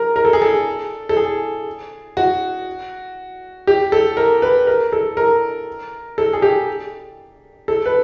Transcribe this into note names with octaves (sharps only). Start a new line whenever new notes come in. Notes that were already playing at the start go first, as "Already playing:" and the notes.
Already playing: A#4
A#4
A4
G#4
A4
A4
G#4
F#4
G4
A4
A#4
B4
A#4
A4
A#4
A4
G#4
G4
A4
B4